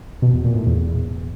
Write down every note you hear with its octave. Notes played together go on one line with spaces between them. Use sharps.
B2
E2
A#2
A2
E2